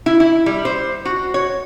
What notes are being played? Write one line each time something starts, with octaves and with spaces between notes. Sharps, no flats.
E4
E4
G3
C5
F#4
C#5